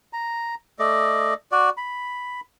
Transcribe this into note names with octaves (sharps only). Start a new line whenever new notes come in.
A#5
A3 D5 D#5
F#4 D5
B5